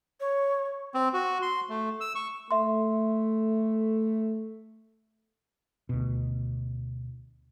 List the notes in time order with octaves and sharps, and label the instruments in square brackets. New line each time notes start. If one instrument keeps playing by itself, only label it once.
[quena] C#5
[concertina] C4
F#4
C6
A3
E6
C#6
[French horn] A3 [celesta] E5 C6
[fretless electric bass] D2 B2